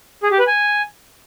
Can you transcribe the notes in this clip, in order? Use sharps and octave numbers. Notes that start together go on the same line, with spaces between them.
G#4
G4
B4
G#5